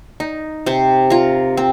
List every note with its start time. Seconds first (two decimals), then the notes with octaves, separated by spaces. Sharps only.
0.20 D#4
0.66 C3 C5
1.10 F4 A#4
1.57 C4